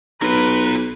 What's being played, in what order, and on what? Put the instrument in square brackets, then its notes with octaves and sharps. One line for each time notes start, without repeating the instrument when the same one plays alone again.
[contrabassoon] B1 [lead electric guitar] F4 A#5 [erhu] B4